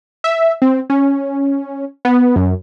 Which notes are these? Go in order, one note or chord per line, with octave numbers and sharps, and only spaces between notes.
E5
C4
C#4
B3
F#2